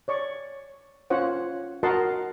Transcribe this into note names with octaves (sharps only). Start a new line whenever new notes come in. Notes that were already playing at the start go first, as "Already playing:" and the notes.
C#5 D5 C#6
C#4 F4 C5 C#5 F#5
F#4 A#4 D#5 F#5 A5 C6